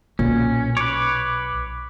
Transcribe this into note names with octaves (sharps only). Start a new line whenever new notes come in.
B1 A#2 C#4
B4 C#5 D6